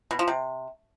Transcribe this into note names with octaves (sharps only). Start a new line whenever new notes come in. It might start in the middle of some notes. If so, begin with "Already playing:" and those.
B2
F3
C3